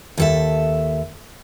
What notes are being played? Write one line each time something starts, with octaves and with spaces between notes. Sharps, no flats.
D#2 A4 E5